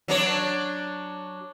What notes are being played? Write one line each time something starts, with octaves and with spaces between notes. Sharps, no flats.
F#3 D4 C#5